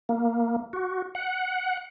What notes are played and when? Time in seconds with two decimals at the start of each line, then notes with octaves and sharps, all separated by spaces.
0.09 A#3
0.73 F#4
1.15 F#5